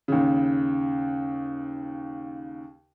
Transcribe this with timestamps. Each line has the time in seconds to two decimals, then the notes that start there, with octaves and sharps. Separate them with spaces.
0.08 D#2 C#3